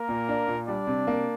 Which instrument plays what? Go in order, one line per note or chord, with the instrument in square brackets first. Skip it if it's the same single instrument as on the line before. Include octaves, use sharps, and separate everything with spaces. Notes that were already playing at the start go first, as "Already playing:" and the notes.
Already playing: [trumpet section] A#3 A#4
[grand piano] A#2
D4
A#2
[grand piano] G3 [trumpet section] D4 D5
[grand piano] C3
A#3